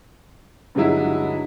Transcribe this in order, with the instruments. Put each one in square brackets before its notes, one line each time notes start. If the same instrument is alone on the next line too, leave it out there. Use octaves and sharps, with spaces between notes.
[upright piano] G2 D3 F#3 G#3 D#4 E4